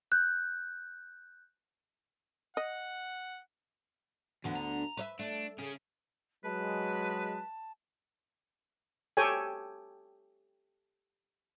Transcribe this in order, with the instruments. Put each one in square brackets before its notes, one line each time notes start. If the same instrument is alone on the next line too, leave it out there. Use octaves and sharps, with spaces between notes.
[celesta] F#6 G6
[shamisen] D#5 [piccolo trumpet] F#5
[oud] D2 D3 B3 [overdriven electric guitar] E3
[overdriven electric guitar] A#5
[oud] B4 C#5 E5
[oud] A3 [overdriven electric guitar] D4
[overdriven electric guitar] C#3 C#4 [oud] G#4
[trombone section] F#3 G#3 [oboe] B4 [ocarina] A5
[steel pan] G4 A4 C#5 G5 G#5